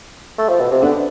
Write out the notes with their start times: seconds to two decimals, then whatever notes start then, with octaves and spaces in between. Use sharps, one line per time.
0.38 A3
0.49 F3
0.60 B2
0.71 C3
0.82 D3 B3 D4